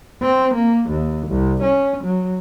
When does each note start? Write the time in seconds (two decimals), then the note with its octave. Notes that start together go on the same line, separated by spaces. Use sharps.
0.22 C4
0.54 A#3
0.89 D#2
1.27 C2
1.63 C#4
2.04 F#3